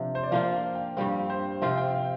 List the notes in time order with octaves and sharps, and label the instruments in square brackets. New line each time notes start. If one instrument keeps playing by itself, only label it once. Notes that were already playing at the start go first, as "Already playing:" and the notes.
Already playing: [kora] C3 F3 D4
[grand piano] C5
D5
[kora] F3 A#3 D4 F4 [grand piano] F5
[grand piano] F5
G5
[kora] G2 G3 C4 [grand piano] F5
[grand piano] C5
[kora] C3 F3 C4 F4 [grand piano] F5
[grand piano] G5
F5